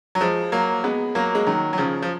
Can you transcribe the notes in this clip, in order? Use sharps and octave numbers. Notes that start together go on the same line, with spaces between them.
F#3
F3 G#3
F#3 A#3
G#3 B3
F#3 A#3
G#3
D#3 F#3
F#3
C#3 F3
F3